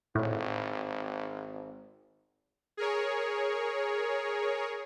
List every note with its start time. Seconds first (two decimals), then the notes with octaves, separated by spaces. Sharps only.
0.15 G#1 A2
2.77 G#4 A#4 C#5